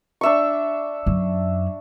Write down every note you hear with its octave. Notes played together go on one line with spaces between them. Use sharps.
D4 E5 C#6
F#2